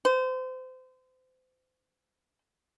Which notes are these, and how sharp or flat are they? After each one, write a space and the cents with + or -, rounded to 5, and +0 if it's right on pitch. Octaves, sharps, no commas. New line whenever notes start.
C5 -30